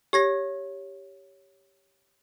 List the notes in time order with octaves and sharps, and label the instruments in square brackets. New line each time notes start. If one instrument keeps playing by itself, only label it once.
[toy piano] G4 [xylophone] C#5 G#6 A#6